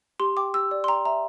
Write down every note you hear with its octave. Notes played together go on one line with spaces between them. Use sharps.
G4 C6
G5 D6
G4 E6
D5
C6
G5 A#5
E5 A#5